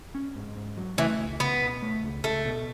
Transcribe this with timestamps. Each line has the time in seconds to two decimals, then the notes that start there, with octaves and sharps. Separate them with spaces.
0.15 C#4
0.36 G#2
0.57 G#2
0.77 F#3
0.98 E3 A3
1.19 C#2
1.40 C#2 B3
1.61 B2
1.82 A3
2.03 C#2
2.23 C#2 A3
2.45 B2